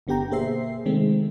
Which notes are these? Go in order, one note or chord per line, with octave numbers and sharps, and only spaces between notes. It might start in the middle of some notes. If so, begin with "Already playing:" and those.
G1 D3 B3 G4 G5 A#5
B2 A#3 G#4 C5 E5 C7
C3 D#3 G#3 A3 C4